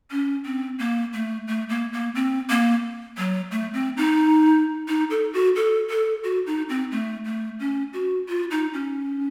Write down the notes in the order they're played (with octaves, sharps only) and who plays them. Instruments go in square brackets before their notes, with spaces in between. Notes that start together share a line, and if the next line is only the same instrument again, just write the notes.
[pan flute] C#4
C4
A#3
A3
A3
A#3
A#3
C4
A#3
F#3
A3
C4
D#4
D#4
A4
F#4
A4
A4
F#4
D#4
C4
A3
A3
C#4
F#4
F4
D#4
C#4